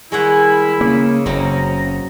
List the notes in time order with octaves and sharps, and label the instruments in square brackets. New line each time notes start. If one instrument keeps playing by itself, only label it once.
[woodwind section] D#3 G3 E4 [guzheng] G#3 C#5 F#5
[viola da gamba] C#3 [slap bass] A#3
[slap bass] F#1 [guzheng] F#3 C4 [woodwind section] A#5